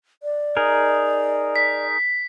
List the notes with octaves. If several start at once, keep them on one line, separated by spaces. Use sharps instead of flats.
D5
D#4 G#4 A#4
B6